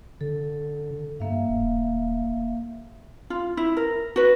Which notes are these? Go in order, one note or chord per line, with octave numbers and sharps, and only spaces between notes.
D3 A4
G2 A#3 E5 F5
D#1
F4
E4
A#4
F#4 B4